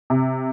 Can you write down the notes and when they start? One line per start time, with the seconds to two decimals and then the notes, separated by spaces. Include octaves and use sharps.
0.10 C3